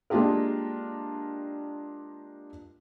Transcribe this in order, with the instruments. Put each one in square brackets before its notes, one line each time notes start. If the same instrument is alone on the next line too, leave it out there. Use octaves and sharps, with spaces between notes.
[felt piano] G#3 A#3 D4 F4 G4 A#4